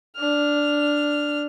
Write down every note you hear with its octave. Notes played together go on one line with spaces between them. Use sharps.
D4 F6